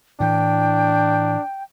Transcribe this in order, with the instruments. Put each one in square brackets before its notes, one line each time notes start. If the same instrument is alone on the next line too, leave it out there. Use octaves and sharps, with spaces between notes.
[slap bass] A2 E3 [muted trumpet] D4 [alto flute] G5